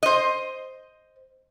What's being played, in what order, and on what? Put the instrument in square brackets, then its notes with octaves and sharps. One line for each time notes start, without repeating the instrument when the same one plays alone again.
[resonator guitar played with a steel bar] C5 D#5